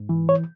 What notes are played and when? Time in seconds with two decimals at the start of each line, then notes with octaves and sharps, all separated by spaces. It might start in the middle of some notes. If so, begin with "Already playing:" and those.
Already playing: G#2
0.09 E3
0.29 C#5